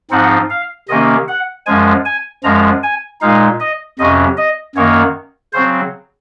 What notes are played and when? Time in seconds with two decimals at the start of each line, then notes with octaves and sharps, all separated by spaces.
0.11 G#2 F3 C4 D#4 F#5
0.50 F5
0.88 C3 D#3 A#3 C#4 D#5
1.28 F#5
1.66 F#2 F3 G#3 G#5
2.05 G#5
2.43 F#2 F3 G#3 A#5
2.83 G#5
3.21 A#2 G#3 D#4 F5
3.60 D#5
3.99 F2 C3 F#3 C#4 D#5
4.37 D#5
4.75 F#2 D#3 A#3 C#5
5.53 C#3 F#3 C4 C5